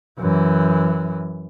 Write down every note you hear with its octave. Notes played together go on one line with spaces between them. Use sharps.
F#2 E3